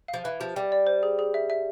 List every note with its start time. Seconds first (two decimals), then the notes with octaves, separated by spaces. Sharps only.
0.08 F5
0.14 F3
0.24 E3 B4
0.40 F3 G4
0.56 G3 G5
0.72 D5
0.87 C5
1.03 G#4
1.19 G#4
1.34 E5
1.50 E5